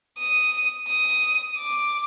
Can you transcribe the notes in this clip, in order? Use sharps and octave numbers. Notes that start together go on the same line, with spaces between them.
D#6
D#6
D6